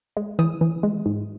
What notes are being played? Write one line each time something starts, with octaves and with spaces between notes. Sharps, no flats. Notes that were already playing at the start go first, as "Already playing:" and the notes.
G#3
E3 D#6
E3
G#3
G#2